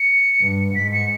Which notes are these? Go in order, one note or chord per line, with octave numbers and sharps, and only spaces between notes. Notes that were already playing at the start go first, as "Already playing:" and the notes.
Already playing: C#7
G2
G#2 B6
C#7